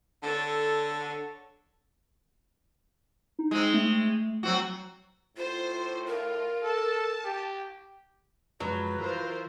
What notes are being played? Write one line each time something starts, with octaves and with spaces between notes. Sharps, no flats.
D3 A4 C#5
D#4
G#3 C4
A3
F#3 C4 F#4
A2 F4 C5
F4 A#4
A4 A5
G4
F#2 F3 F#3 G#3 B4
E3 F4 A#4 C5